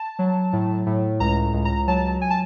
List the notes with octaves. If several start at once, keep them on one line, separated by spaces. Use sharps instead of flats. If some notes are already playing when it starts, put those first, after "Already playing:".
Already playing: A5
F#3
A2
A2
C#2 A#5
C#2
A#5
F#3 A5
G#5
A5